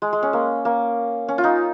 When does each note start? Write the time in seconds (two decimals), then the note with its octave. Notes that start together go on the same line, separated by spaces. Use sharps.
0.02 G#3
0.13 G#3
0.23 C#4
0.33 A#3
0.65 A#3
1.28 C#4
1.38 F4
1.44 D#4